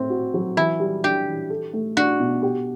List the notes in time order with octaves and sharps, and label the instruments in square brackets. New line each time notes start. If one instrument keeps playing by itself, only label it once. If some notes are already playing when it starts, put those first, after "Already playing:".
Already playing: [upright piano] A2 C4
F#4
F#3
[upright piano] E3 [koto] E4
[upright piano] G3
[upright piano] D4 [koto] G4
[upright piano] E3
A4
A3
[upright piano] D4 [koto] F#4
[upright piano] B2
G4